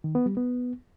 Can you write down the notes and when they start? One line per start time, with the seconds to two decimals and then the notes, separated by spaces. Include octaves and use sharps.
0.04 D#3
0.15 B3
0.26 G3
0.37 B3